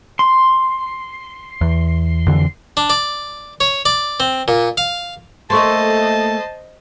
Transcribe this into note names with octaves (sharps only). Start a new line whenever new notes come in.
C6
E2
F2 D3 E3
D4
D5
C#5
D5
C4
A#2
F5
A3 A#3 C5 D#5 A5 C6 C#6